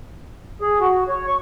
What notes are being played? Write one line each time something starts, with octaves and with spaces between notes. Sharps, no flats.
G#4
F#4
C#5
C#6